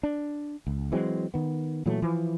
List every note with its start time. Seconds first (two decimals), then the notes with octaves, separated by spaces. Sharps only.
0.03 D4
0.67 C#2
0.92 E3 F#3 G#3 C4
1.34 D#3 B3
1.86 A#2 E3 F#3 A3
2.02 E3 F3